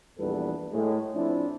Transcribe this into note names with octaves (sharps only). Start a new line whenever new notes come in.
A#1 E2 G3 B3 A4 B4
A2 G#3
F3 C4 D4 E4